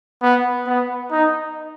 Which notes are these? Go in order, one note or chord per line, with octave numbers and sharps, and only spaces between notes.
B3
B3
D#4